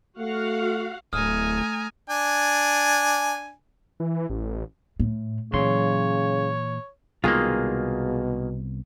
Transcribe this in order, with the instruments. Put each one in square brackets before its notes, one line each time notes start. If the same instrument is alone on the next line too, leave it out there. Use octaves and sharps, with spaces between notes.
[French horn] A3 [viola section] F#4 F5 F#5
[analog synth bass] D1 [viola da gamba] A3 [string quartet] G#5 A#5 [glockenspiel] D#6 F6
[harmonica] D4 G#5
[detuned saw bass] E3
A1
[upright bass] A2
[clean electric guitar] A#2 E3 C6 [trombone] C#3 [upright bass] F#3 [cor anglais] C#5
[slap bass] C2 B3 [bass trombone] B2 [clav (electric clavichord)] D#3 G#3 A#3 [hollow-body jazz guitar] F4 G#4